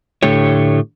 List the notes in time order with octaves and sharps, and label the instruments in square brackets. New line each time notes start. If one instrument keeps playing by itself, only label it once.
[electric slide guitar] A2 D3 A3 G4 A4 C#5